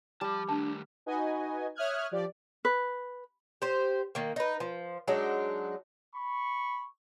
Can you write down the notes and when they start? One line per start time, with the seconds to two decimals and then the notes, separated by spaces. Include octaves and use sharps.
0.21 F3 G3 A5
0.49 D#3 A3 D4 A5
1.06 D#4 F#4 B4 D#5 G#5
1.75 C#5 E5 D#6 F6 F#6 G#6
2.11 F3 G4 D5
2.65 B4
3.62 G4 C5
4.15 D#3 A#3
4.36 D#4 B4
4.60 F3
5.08 F#3 G#3 D4 D#4
6.15 B5 C#6